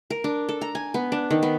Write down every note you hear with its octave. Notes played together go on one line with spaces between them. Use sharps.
A#4
D4
A4
A#5
G#5
B3
D4
D#3
B3